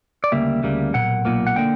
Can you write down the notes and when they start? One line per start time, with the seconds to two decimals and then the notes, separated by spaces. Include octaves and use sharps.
0.24 D5
0.32 D2 C#3 G3 A#3 E5
0.63 D2 C#3 G3 A#3
0.94 B1 A#2 A#3 F#5
1.25 B1 A#2 A#3
1.47 F#5
1.56 D3 A#3 G5